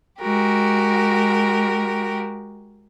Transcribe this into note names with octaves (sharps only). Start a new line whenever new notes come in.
G#3 F#4 G4 A#4